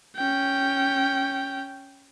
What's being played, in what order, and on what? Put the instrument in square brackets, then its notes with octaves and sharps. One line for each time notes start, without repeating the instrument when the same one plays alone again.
[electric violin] C#4 G5